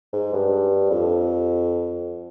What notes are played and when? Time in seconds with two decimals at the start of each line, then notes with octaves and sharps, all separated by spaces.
0.13 G#2
0.33 G2
0.91 F2